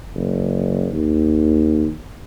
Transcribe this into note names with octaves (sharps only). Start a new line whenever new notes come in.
F#1
D#2